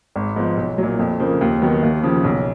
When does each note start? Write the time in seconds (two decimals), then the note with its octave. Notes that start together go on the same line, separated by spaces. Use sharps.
0.16 G#1
0.36 G#2 F3 B3
0.57 B1
0.78 A#2 F#3
0.99 F2
1.19 C#3 F3 A#3
1.41 D#2
1.62 D#3 F#3 B3
1.83 D#2
2.03 C#3 F3
2.24 B1